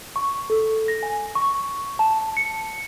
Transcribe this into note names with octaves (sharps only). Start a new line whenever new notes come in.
C#6
A4
A#6
G#5
C#6
A5
C#7